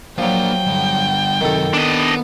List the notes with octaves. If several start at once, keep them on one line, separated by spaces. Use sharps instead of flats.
F3 F#3 A#3 D4 G5
D3 G3
F#2 C3 D#3 A4
B3 D4 D#5